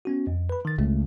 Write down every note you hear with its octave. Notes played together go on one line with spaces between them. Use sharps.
B3 C#4 F#4
F2
B4 B5
D#3 A6
C#2 A3